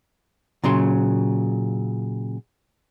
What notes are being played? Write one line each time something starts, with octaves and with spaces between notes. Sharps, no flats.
A#2 C#3 F#3 C6